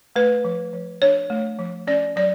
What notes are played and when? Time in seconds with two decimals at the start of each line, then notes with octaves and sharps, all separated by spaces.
0.16 A3 B4
0.44 F3
0.73 F3
1.02 D4 C#5
1.30 A3
1.58 F3
1.87 C#4 D5
2.16 F#3 D5